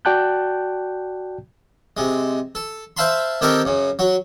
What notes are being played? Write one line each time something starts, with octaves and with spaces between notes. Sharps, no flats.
F#4 D5 G5 A5 F#6 G6
C3 G#3
A4
C5 E5 F5 A5 B5 C6
D#3 C4 G4 A4 A#4 D#5
F#2 C#3
F#3 F#4